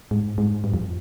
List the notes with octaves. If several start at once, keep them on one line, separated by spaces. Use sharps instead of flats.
G#2
G#2
G2
F2